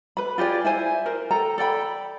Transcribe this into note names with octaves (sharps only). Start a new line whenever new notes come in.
B4 B5
F4 G4 G#4 D5
E4 C5 G#5
A#4 C5
A4 G5 A#5
A4 D5 G5 B5